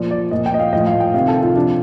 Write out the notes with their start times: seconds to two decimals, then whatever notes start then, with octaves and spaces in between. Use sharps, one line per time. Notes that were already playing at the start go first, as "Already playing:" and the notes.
Already playing: A#2 F3 D5
0.11 D5
0.31 A#2 F3 D#5
0.46 G5
0.54 D#5
0.59 F5
0.73 A2 F3 D#5
0.87 F5
1.00 G5
1.14 C3 D#3 F5
1.28 A4
1.42 F4
1.55 C3 F3 D4